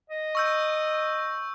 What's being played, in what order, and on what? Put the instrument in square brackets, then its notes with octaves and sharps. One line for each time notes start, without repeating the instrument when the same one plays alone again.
[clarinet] D#5
[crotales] C#6 E6 G6